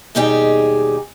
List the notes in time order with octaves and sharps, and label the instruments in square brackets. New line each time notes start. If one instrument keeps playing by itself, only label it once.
[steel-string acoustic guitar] D#2 B2 G3 D#4 G4 G#4